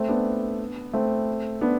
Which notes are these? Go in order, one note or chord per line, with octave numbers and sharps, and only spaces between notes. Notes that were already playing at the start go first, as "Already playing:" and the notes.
Already playing: A3 C4
B3 D4
A3 C4
B3 D4